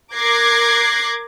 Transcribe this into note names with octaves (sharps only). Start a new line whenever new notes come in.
A#4 D6 F#6 G#6 A#6 C7